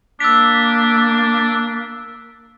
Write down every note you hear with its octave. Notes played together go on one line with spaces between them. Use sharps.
A#3 D4 E6 B6